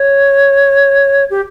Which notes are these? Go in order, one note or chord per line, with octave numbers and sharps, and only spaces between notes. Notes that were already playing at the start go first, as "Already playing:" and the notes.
Already playing: C#5
G4